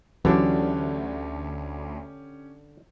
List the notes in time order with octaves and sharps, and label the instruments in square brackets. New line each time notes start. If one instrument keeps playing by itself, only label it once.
[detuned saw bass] D2 [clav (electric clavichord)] D3 D4 [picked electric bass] E3 F#3 [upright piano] C#4 G4